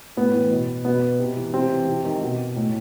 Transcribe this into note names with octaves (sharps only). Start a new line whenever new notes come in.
A2 B3
E3
B2
B2 B3
C3
E3
C3 C4
E3
C3
D#3
B2
A2